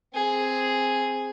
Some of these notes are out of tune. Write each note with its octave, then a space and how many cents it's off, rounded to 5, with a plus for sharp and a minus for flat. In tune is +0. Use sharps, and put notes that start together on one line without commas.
C4 +0 G#4 +0